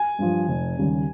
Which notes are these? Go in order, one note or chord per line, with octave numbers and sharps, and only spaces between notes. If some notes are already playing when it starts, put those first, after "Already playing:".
Already playing: G#5
G2 F3
F1
D#2 C#3 G3 C#4